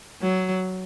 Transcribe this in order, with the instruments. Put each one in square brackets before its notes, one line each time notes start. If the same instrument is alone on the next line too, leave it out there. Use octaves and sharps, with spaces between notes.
[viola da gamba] F#3